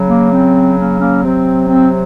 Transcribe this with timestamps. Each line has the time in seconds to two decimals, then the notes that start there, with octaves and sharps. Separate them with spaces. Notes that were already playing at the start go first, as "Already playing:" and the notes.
Already playing: C#3 F#3
0.09 A#3
0.32 C4
0.78 A#3 C#4
1.00 A#3 C#4
1.23 C3 F#3 C4
1.68 C4